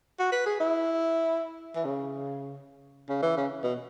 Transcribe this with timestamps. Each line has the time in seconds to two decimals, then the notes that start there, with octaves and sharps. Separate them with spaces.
0.19 F#4
0.32 B4
0.46 G#4
0.60 E4
1.75 E3
1.85 C#3
3.09 C#3
3.23 E3
3.37 C#3
3.64 B2